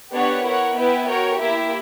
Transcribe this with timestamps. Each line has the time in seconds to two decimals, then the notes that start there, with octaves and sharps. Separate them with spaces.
0.13 B3 D4 G4 C#5 F#5
0.44 E4 A#4 C#5 F#5
0.76 B3 E4 B4 E5 G5
1.07 F#4 A#4 C#5 G5
1.39 A#3 E4 G4 A#4 E5